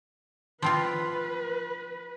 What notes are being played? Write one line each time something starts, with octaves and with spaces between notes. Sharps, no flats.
F3 C4 F4 B4